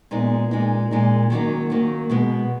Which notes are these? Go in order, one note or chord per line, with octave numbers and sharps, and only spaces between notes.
A#2 G#3 B3 D#4
A#2 G#3 D#4
A#2 G#3 D#4
D#3 F#3 A#3 D#4
D#3 F#3 A#3 D#4
B2 G#3 B3